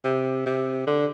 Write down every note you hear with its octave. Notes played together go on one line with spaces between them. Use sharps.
C3
C3
D3